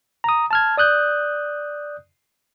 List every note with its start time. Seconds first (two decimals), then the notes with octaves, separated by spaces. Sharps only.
0.24 A#5 D#6
0.51 A5 F6 G#6
0.77 D5 D#6 F#6 G6